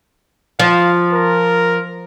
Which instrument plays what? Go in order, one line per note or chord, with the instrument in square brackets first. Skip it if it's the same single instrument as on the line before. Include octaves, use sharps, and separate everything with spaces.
[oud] F3 [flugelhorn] F5
[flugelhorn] A#4